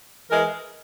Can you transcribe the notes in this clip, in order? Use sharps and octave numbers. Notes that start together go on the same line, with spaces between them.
E3 G#3 A#4